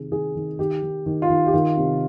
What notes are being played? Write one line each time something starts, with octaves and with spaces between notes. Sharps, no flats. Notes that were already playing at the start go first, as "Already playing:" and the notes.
Already playing: C3 D#3 G#4
D#3 G#4
D#3
D#3 G4
D#3
D#3
F4
D#3
G4
D#3 F4
C3